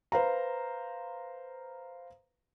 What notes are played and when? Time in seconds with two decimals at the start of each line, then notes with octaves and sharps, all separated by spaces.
0.12 B4 C5 F5 A#5